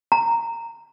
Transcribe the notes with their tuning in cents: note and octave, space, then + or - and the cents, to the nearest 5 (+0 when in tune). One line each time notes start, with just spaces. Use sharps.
A#5 -10